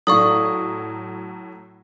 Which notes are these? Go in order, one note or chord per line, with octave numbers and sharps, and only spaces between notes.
A2 F#3 A4 D5 F5 C#6 D#6